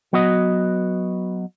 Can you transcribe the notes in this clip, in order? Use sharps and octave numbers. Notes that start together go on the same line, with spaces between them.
F#3 B3 F#4 B4 D#5